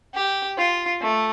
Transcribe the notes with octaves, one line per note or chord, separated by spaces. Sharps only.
G4
F4
A3